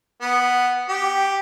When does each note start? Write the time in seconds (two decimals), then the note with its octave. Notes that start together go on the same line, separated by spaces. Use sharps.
0.22 B3
0.89 G4